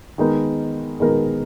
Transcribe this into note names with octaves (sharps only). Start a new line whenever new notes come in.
D#3 G#3 B3 D#4 A#4
D#3 G#3 B3 D#4 A#4